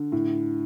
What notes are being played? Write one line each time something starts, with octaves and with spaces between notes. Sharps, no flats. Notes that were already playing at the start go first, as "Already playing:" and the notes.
Already playing: D3
A2